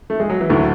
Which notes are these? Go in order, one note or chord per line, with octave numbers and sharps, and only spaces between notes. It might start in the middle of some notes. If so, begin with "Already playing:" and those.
A3
G#3
F#3
E3
D2 A2 D3 F#3 A3 E4